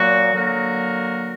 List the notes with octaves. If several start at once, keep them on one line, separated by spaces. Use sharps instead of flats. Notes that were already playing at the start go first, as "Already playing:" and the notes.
Already playing: A#2 F#3 A#3 F#4
D3 F#3 A#3 F#4 A#4